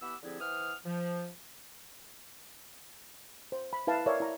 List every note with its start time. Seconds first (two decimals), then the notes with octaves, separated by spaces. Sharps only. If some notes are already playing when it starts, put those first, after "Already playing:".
0.02 E3 B3 G4 F#5 B5 E6
0.23 D3 F3 C4 E4 G4 G#4
0.40 E3 C5 F#5 D#6 F6
0.85 F3
3.52 C5
3.73 B5
3.87 E4 B4 F5 A5
4.06 A#4 C#5 D5 E5 F5
4.20 E4 A#5